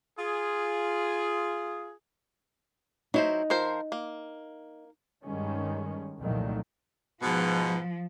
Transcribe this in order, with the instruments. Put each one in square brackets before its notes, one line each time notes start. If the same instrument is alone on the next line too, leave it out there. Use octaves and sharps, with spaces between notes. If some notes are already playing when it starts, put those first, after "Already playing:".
[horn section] F4 G#4
[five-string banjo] F#3 E4 C5 [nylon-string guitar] D#4
[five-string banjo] F3 A#4 C5
A#3
[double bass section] G2 D#3 G#3 C#4
C2 F2 A#2 D#3 F#3 A3
[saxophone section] G#2 B2 [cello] F3